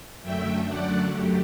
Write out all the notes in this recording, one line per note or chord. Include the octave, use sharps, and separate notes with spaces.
F#2 D3 F#3 A3 E5 G5
D5 F#5
G4